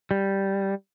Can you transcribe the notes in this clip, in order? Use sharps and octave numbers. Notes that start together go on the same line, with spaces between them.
G3